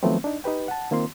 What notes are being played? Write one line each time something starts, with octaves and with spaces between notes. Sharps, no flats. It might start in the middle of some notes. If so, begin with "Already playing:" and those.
D#3 F3 F#3 A3 B3 C4
D4 D#4
D#4 G4 B4 G5
F#5 A5
D#3 A#3 C4 F4 C6